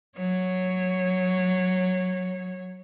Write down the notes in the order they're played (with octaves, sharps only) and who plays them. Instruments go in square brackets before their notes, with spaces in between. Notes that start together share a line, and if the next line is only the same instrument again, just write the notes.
[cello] F#3 C#5